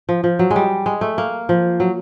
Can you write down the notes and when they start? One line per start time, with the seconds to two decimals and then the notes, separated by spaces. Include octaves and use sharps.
0.09 F3
0.24 F3
0.39 F#3
0.51 G#3
0.56 G3
0.86 G#3
1.01 A3
1.18 A#3
1.49 F3
1.80 F#3